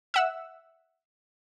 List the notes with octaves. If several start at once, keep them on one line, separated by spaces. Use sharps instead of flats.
E5 F#5 E6